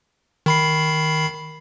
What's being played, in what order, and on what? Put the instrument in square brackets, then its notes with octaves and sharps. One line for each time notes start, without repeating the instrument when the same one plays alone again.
[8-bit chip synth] D#3 B5 C7